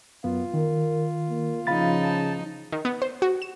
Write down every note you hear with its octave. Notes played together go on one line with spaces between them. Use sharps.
F#2 B3 F4
D#3 A#4
A#3
C#3 F3 D#4 F5 B5 A6
A5
D#3
B3
C5
F#4
E7